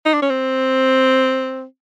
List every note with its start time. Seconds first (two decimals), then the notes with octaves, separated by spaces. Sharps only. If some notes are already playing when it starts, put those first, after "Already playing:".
0.05 D#4
0.14 D4
0.22 C#4
0.30 C4